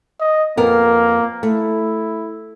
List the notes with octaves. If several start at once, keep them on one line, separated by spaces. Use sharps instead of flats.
D#5
F2 A#3 B3 A#4
A3 E4